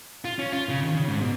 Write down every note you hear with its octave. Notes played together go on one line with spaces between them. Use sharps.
F4
C#4
F4
C#3
D#3
C#3
G#2
B2